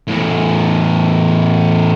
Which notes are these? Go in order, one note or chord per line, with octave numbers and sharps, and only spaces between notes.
E2 A2